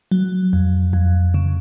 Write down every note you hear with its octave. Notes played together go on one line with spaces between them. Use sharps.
F#3
F2
F2
C#3